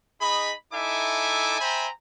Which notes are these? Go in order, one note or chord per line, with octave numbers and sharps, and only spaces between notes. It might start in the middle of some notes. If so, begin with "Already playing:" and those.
D#4 G#4 D#5 B5
D#4 E4 A4 E5 G#5 D6
C5 E5 G5 G#5 A#5 B5